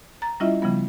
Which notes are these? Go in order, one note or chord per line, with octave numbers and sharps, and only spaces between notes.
A#5 A6
G3 C#4 E4 F4 D#5 E5
C#3 F3 G3 B3